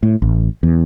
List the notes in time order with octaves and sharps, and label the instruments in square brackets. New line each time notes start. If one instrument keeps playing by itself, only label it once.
[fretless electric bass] A2
A1
E2